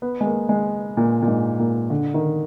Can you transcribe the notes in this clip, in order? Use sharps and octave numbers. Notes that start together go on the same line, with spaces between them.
B3
G#3
A#3
G#3
A#2
A#2
G#2
A#2
D3
D#3